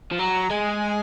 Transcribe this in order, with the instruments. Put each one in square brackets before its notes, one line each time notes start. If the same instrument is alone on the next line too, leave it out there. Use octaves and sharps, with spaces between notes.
[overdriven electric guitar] F3
[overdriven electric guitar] F#3 [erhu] A#5
[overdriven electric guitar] G#3 [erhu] G#5